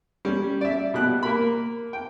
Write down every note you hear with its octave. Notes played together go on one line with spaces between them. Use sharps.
G3 C#4
D5 E5
B2 G4 F#6
A#3 A#4 B5
G5